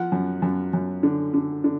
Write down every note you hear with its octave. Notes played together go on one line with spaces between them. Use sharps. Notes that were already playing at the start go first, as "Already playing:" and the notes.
Already playing: F3 F#5
F#2
F#2
F#2
D3
D3
D3